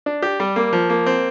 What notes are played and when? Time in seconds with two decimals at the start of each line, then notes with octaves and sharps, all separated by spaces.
0.06 D4
0.22 G4
0.40 G3
0.56 A#3
0.73 F3
0.90 A#3
1.06 C4